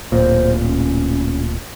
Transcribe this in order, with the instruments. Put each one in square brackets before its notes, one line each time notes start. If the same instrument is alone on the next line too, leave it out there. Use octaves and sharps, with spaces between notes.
[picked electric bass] D1 A#2 [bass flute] C5
[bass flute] C#4